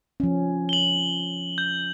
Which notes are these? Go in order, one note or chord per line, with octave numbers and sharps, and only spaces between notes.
F3 C#4
F#7 G7
G6